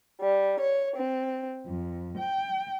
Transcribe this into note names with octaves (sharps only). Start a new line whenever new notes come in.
G3
C#5
C4
F2
G5